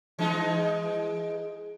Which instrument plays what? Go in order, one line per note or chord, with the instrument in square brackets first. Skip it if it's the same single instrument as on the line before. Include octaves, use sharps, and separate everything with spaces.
[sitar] E3 G#3 D#4